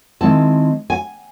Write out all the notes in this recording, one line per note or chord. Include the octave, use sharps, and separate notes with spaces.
D#3 G#3 C4 E4 A5
G#5